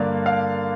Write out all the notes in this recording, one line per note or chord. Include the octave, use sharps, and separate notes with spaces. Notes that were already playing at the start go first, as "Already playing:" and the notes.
Already playing: G2 D3 A#3 D5 F5
F5